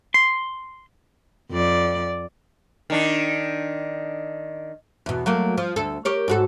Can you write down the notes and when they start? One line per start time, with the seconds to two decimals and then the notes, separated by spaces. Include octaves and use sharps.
0.14 C6
1.51 F2 D5
2.90 D#3 D4
5.06 E2 B2
5.26 F#3 A3 A#3
5.58 F3
5.76 D2 A4
6.05 G4 A#4 C#5
6.28 G#2 F#4 A4